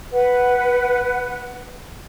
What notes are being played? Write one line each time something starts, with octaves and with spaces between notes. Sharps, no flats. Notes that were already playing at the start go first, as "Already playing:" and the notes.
B4 F#5